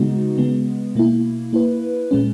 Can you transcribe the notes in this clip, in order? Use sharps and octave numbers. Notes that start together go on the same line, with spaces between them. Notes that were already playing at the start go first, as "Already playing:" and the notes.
Already playing: C#3 G#3 B3 D#4 F#4
C#3 G#3 B3
B2 A#3 E4
A#3 E4 B4
A#2 G#3 C#4